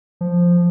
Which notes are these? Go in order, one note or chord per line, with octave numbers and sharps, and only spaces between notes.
F3